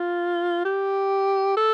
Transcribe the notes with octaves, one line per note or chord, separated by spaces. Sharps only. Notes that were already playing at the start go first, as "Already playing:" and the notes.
Already playing: F4
G4
A4